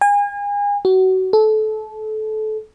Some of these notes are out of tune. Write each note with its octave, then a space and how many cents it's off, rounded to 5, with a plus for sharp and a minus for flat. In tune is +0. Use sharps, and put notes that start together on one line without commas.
G#5 -35
F#4 +25
A4 -25